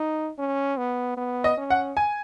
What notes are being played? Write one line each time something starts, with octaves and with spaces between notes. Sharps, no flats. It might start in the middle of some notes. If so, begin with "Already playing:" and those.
Already playing: D#4
C#4
B3
B3
D#5
C#4
F#5
G#5